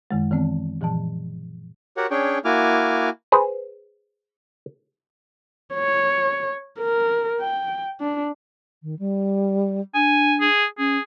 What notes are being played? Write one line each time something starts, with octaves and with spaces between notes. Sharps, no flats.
F#2 D#3 G#3
D#3 E3 B3 C4
A#2 E3 F3 A5
F#4 G4 A#4 C#5 F#5
C#4 D4 G#4 C#5 G5
A#3 E4 F#4 G#5 D6 F6
G#4 B4 C5
C#5
A#4
G5
D4
D#3
G3
D4 G#5
G#4
C#4 G#4